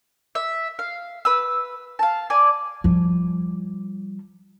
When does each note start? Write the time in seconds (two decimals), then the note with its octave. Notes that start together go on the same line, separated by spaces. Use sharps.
0.35 E5
0.79 F5
1.25 B4 E6
1.99 F5 A5
2.30 D5 G#5
2.84 F3 G3